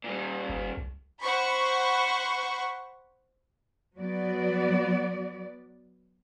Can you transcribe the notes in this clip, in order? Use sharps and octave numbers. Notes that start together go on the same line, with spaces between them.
A#2 G3
G1
C2
C5 F#5 B5 C#6
F#3 B3 F#4 D5